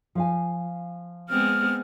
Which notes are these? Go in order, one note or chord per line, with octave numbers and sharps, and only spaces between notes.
F3 F5 G#5
G#3 B3 C4 F6